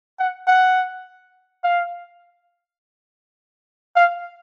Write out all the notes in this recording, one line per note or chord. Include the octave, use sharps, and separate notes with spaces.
F#5
F#5
F5
F5